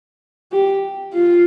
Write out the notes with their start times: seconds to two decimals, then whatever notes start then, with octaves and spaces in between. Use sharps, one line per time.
0.52 G4
1.14 F4